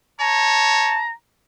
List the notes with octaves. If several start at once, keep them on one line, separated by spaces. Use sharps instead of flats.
C#5 A5 A#5